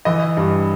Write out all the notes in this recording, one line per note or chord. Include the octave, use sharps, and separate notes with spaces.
E3 D#5
G2